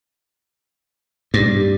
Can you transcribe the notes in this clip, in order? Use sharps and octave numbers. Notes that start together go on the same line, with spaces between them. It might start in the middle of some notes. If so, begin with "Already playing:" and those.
G2